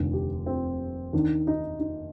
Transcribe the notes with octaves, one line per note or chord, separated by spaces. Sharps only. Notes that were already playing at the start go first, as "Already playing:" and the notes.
Already playing: F1 D#2 D3 F4
G4
C4
D#2 D#3 D4
D#4
D#4